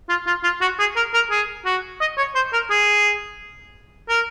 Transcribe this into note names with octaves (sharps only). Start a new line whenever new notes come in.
F4
F4
F4
F#4
G#4
A#4
A#4
G#4
F#4
D#5
C#5
C5
A#4
G#4
A#4